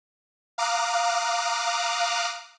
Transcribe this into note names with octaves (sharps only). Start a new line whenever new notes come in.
F5 A#5 D6 D#6 F6 F#6